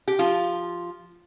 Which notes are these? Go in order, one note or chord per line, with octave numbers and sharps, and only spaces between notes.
G4
F3 F4